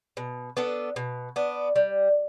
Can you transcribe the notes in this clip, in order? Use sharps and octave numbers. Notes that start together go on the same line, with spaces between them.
B2
B3 D4 A4
B2
B3 D4
G3